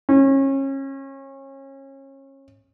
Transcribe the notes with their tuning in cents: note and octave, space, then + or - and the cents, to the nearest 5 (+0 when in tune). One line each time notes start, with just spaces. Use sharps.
C#4 -30